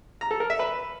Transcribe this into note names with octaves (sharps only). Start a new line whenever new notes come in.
A#5
A4
A#4
E5
B4